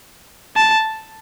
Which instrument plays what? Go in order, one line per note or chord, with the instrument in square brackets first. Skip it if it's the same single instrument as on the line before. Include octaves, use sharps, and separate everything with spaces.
[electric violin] A5